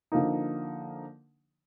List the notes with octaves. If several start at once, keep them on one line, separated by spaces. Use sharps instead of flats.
D3 F3 A#3 D#4